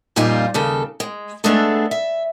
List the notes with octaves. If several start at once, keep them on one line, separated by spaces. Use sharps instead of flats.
F2 A#2 G3 D#4 F4 G#5
D#2 C#3 A4
G#3
G#3 A3 B3 D4 G#4 A4
E5